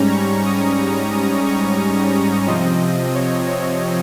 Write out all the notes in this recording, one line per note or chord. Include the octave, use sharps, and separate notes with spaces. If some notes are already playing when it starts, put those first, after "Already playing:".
Already playing: G#2 G3 C#4 A#5
C#6
D#6
C#6
D#6
C#6
C3 F3 C4 D#5
C#5
C#5